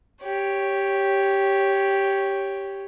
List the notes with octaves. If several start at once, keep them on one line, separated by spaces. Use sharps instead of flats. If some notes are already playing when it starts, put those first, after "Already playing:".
G4 C#5